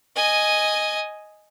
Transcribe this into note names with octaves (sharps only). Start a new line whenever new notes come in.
D#5 G#5